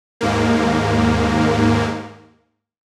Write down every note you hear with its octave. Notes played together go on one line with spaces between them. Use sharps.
D#2 G#2 A#3